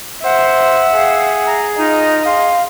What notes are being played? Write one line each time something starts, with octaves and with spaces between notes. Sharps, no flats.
C5 E5 F#5
G#4 F5
A#5
D#4 F4 D#5 A#5
G#4 F5 C6